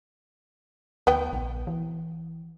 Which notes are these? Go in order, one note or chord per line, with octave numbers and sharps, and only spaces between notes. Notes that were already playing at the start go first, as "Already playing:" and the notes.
D2 B3 G5
A#1
E3